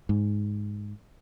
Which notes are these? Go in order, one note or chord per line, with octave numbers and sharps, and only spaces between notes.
G#2